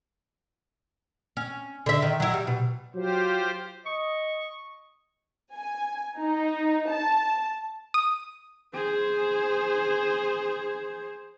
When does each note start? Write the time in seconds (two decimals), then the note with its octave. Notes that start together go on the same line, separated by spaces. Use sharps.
1.37 C#4
1.86 D3 E5
2.02 D#3
2.20 F#3 E4
2.34 G3
2.47 B2
2.95 F#3 F4 G4 C5
3.86 D#5 C#6
5.55 G#5
6.19 D#4
6.89 A5
7.94 D#6
8.74 G#4 C5